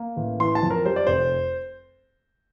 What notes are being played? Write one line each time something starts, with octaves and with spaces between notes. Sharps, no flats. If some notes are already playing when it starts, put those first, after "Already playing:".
Already playing: A#3
A1
E3 C6
A5
F2
A#4
G3 C5
D5
F1 C5